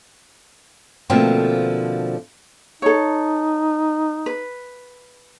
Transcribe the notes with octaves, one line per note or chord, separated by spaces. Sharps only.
B2 D3 F3 A3 A#3 C4
D#4 A4 C#5
B4